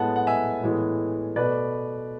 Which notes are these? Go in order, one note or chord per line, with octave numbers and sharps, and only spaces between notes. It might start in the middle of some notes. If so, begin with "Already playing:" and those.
Already playing: A2 G#3 B3 F#5 A5
F#5
E5 G#5
A2 E3 G#3 B3
B2 A3 B4 D5